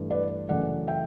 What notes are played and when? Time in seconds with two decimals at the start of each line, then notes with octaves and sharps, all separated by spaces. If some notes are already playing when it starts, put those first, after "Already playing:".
Already playing: G2 E3 A3
0.10 B4 D5
0.49 F#2 C#3 E3 A3 D5 F#5
0.87 E5 G5